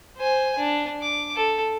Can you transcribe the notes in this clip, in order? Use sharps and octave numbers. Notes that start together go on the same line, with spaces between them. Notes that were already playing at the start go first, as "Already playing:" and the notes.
C5 G#5
D4
D6
A4